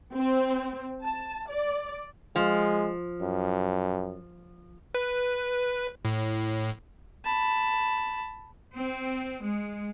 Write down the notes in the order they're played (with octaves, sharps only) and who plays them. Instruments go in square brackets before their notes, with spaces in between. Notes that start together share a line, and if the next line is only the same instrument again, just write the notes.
[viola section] C4
A5
D5
[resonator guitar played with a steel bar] F3 [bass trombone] G#3
[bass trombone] F#2
[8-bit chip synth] B4
A2
[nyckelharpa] A5 B5
[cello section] C4
G#3